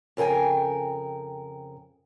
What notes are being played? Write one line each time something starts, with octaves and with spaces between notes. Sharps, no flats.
F2 C#3 A#4 G5 G#5